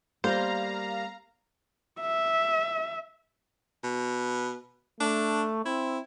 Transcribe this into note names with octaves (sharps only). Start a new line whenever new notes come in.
G3 A#3 C5 F5 A#5
E5
B2
A3 D4
C4 E4